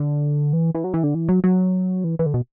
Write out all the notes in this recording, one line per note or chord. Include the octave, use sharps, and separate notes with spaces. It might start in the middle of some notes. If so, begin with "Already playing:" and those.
Already playing: D3
E3
E3
F#3
E3
D3
E3
F#3
F#3
E3
E3
D3
B2